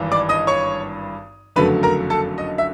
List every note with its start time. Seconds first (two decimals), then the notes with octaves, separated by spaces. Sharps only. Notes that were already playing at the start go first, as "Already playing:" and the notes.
Already playing: G#1 G2 E3
0.12 D5 D6
0.29 D#5 D#6
0.47 C#5 C#6
1.56 F#1 F2 D3 F#3 A3 B4 B5
1.83 A#4 A#5
2.10 A4 A5
2.38 D#5
2.58 E5